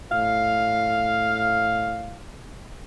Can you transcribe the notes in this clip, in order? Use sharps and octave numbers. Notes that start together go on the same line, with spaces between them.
A2 F5